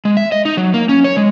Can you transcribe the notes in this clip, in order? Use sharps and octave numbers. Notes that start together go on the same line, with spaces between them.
G#3
E5
D#5
D#4
F#3
A#3
C#4
C#5
G#3